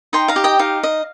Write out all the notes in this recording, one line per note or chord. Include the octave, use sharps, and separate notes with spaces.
D#4 G5 C6
F5 A#5
G4
D#5 G5
D#4 F5
D#5